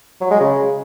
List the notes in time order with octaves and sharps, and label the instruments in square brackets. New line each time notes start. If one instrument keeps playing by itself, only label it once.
[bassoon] F#3
G#3
C#3